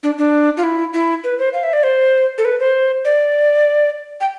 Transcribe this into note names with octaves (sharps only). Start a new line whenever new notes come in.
D4
D4
F4
E4
E4
B4
C5
F5
E5
D5
C5
A4
B4
C5
D5
G5